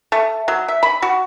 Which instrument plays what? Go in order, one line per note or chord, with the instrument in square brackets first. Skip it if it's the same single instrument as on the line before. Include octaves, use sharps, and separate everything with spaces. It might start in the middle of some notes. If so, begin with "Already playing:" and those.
[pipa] A3
F#3
E5
B5
F#4